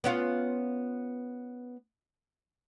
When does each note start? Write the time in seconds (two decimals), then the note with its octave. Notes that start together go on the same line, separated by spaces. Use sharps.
0.04 B3 C#4 F4